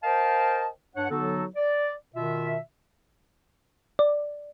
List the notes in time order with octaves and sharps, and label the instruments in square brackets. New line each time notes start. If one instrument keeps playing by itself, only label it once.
[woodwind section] A#4 C5 D#5 F5 G5 A5
G2 D4 C#5 F#5
D3 F#3 B3 D#4 F#4 A4
D5
B2 D#3 F4 E5
[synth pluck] D5